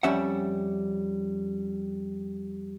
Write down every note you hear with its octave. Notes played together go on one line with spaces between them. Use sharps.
F2 G3 C#4 E5 F#5